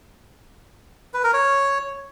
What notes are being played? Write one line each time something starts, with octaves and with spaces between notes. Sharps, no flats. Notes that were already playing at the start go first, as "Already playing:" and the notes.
B4
A#4
C#5